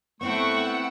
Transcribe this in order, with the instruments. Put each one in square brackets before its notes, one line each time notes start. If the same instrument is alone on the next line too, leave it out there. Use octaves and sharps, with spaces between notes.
[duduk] A3 [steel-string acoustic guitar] B3 C4 E4 [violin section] F#5 G5 E6 [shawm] C#6